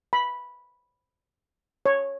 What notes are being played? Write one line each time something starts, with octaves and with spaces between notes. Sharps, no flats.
B5
C#5